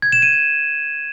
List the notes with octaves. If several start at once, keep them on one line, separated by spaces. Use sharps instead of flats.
G#6
E7
D#7
G#6